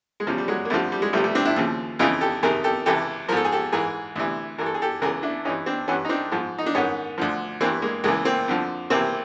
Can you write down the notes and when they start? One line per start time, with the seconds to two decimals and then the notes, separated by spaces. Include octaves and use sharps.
0.20 G#3
0.27 E2 C#3 F3 G3
0.38 G3
0.48 F#3 G#3
0.65 A#3
0.70 F2 D3 F3 G3 A3
0.92 G3
1.02 G#3
1.13 C#2 C3 F3 G3 A3
1.24 G3 A3
1.35 C4 D4
1.45 D4 E4
1.56 D#2 C#3 F3
1.99 F2 C#3 E3 D#4 F4
2.21 G4 A4
2.43 F2 C3 D#3 G#4 A#4
2.64 G4 A4
2.86 C#2 C3 E3 G4 A4
3.28 F3 A#4
3.32 G#2 A4
3.45 G#4
3.52 G4 A4
3.72 G#2 E3 G#4 A#4
4.16 D2 C3 E3
4.58 G2 E3 A#4
4.66 A4
4.74 G#4
4.82 G4 A4
5.02 C#2 C#3 E3 G#4 A#4
5.23 D4 E4
5.45 G2 E3 C#4 D#4
5.66 C4 D4
5.88 G2 E3 B3 C#4
6.05 D#4
6.09 C4 D4
6.31 G#2 F3
6.58 D#4
6.66 D4
6.75 G#2 D#3 B3 C#4
7.18 D2 D3 F3
7.61 E3 A#3 C4
7.63 G2
7.82 G#3 A#3
8.04 C#2 C#3 E3 G#3 A#3
8.25 A#3 C4
8.48 F2 D3 F3
8.90 C#2 C3 E3 A#3 C4